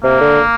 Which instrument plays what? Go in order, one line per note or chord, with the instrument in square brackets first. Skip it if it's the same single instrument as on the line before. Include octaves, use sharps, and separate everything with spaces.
[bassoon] C3 [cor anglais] A#3
[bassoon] D3